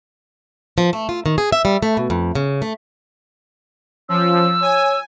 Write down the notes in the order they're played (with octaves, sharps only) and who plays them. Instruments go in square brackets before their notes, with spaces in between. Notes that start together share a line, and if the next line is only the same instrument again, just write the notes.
[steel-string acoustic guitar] F3
A3
F4
D#3
G#4
E5
G3
A3
B2
F2
C#3
A3
[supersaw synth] F3 [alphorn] C#4 [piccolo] E6
[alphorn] C#5 [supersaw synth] G#5